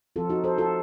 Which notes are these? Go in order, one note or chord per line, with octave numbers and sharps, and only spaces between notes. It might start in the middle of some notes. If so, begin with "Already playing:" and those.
F3 C4 F4 A4
D#4 F#4
A4 C5
F4 A4